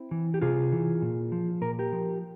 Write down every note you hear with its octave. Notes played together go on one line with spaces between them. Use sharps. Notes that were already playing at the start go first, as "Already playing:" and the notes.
Already playing: C4 E4
E3
G4
C3 F4 G#4
E3
A#2
F3
A#2 A#4
G4 A#4
F3